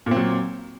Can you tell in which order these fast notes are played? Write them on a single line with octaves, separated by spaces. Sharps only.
A#2 C4 F#3